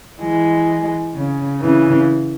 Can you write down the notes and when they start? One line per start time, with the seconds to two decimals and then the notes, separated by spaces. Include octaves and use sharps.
0.21 E3 G#3
1.15 C#3
1.61 C#3 E3